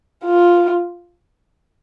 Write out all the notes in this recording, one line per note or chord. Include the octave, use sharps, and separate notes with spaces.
F4